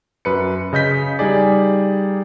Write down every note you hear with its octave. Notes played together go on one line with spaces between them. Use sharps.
F#2 B4 C#7
C#3 D#5 G6 B6
G3 D#4 G#4 D5